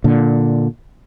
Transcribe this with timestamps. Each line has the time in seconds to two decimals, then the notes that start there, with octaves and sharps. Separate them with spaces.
0.04 A#2 D3